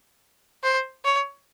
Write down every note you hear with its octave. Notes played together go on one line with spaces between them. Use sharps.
C5
C#5